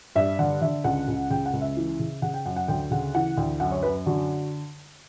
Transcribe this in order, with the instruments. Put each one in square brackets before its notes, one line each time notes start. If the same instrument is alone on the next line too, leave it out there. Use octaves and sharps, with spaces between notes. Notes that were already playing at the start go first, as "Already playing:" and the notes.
[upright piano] G2 E5
D3 F#5
D3 E5
C#2 F#5
C#2
C#3 G5
F#5
C#2
E5
E3
C#3
C#3 F#5
G5
F#2 F#5
F#5
D2 G5
C#3 F#5
E3 F#5
D2 G5
F#2 F#5
C#5
F#2 B4
D3 F#4